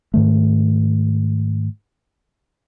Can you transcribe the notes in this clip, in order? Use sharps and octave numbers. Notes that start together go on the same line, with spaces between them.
G#2 D#3 A3